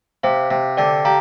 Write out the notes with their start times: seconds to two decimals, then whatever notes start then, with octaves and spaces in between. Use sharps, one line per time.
0.23 C3 C5 F5
0.51 C3
0.77 D3 D5 G5
1.05 G4 F5 A#5